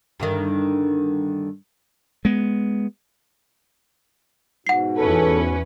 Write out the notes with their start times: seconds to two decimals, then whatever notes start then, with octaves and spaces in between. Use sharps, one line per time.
0.20 G2 D3 D#3
2.25 G#3 B3
4.67 G#2 B2 F#5 C7
4.98 E2 C#4 A4 B4